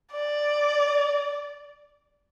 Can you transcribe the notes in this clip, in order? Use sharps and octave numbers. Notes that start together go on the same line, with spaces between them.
D5